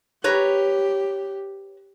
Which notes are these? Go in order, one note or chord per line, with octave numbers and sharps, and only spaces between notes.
G4 B4 C#5 A#5